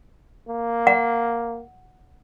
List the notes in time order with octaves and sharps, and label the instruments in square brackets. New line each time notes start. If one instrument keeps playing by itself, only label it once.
[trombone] A#3
[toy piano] F#5